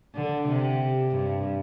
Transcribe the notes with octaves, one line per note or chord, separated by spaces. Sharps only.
D3
C3
G2